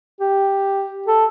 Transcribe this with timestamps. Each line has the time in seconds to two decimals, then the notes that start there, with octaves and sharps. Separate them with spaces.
0.20 G4
1.07 A4